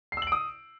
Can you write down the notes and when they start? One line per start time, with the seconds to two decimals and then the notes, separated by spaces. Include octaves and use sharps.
0.12 C7
0.17 E6
0.22 F#7
0.27 D7
0.32 D#6